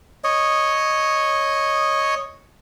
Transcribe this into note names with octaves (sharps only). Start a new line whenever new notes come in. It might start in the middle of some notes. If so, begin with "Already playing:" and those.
C#5 D#5